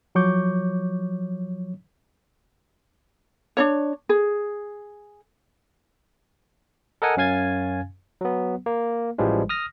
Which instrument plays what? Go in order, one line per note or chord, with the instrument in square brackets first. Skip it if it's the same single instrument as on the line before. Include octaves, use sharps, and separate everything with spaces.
[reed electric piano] F3 F#3 C#5 C#6 D6 G6
[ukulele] D4 D#4 C#5
G#4
[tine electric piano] A4 A#4 D#5 F#5 G#5
F#2 C#4 F5 G#5 G#6 A6
F#3 B3
A#3
A1 E3 F3 G3 G#3
D#6 F6 A#6